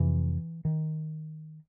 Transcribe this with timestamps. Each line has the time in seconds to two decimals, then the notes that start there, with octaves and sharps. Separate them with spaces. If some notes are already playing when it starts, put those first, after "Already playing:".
Already playing: F2 C3 E3
0.65 D#3